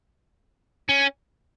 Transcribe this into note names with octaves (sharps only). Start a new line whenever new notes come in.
C#4